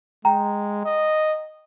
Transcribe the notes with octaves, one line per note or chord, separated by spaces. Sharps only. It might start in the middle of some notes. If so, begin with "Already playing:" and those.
G#3 G5 A#5
D#5